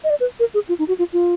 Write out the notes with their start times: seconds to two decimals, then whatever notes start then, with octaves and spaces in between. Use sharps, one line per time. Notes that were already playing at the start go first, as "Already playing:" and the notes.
0.04 D#5
0.10 D5
0.20 B4
0.40 A#4
0.54 G#4
0.69 F4
0.79 D#4
0.88 F#4
0.99 F4
1.13 F4